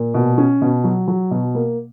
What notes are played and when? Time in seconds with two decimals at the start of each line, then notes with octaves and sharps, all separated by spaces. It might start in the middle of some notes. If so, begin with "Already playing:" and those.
Already playing: A#2
0.14 B2
0.38 C#4
0.61 B2
0.84 F#3
1.08 F#3
1.31 B2
1.55 A#3